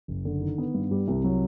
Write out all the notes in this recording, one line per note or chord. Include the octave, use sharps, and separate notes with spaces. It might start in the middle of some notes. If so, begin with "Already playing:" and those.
F#1
D3
D#3
B3
G2
G3
C2
F#3